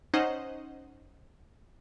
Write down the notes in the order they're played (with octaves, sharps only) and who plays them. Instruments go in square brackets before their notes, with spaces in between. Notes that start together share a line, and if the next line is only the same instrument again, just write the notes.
[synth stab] C#4 D#4 C5 D#5 F#5